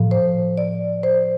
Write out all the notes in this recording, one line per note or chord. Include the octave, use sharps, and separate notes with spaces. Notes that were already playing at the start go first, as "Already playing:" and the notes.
Already playing: A2 F3
C5
D5
C5